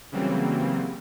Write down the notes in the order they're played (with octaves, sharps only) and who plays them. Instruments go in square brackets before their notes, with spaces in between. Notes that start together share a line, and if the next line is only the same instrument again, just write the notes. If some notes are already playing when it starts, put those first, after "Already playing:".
[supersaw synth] C#3 E3 F#3 G3 A#3 C4